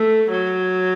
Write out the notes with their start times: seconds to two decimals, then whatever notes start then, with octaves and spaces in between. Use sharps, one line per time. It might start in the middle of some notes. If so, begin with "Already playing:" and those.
Already playing: A3
0.31 F#3